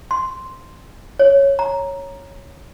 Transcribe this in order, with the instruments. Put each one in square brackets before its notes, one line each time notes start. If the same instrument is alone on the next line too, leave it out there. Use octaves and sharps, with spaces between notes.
[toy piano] C6
C#5
A#5